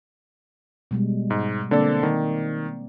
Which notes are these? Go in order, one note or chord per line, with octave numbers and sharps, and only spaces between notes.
B2 G3 G#3
G#2
D3 A#3 C4 A4 D5
D#3